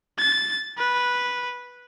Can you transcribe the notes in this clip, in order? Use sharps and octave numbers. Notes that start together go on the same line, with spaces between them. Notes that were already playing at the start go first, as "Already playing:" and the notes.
A6
B4